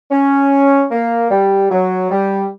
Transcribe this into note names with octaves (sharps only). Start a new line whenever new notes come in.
C#4
A#3
G3
F#3
G3